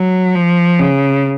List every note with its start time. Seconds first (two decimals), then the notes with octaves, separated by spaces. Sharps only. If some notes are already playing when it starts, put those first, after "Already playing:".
Already playing: F#3
0.35 F3
0.79 C#3